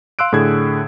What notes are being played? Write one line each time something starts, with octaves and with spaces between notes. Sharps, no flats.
F5 C6 E6 F#6 D7
A2 D3 G#4 G#6